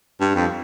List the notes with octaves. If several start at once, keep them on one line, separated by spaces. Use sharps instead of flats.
G2
F2